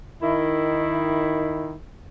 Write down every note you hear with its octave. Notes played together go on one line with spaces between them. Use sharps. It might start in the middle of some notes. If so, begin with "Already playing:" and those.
D#3 E4